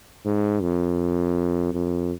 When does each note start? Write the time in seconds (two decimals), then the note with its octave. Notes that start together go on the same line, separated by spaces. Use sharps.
0.25 G#2
0.62 F2
1.73 F2